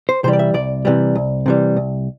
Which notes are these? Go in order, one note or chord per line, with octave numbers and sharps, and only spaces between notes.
C5
C3 E3 G3 C5
D5
E5
C2 D5
C3 E3 G3
C2
C3 E3 G3
C2